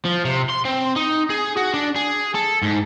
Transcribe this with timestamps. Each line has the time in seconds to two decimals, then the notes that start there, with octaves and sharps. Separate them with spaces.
0.05 F3
0.25 C3
0.50 C6
0.65 C4
0.96 D#4
1.30 G#4
1.57 F#4
1.74 D4
1.96 G#4
2.35 A4
2.63 G#2